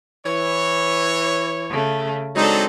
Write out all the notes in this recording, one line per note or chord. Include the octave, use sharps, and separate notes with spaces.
E3 C#5
C#3 A3
F#3 G#3 C4 D4 D#4 A4